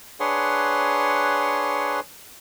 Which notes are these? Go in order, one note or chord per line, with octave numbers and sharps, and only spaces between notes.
D4 G#4 B4 C#5 F#5 C6